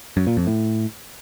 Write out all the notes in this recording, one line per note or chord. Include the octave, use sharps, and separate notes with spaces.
F#2
A#2
F2
A2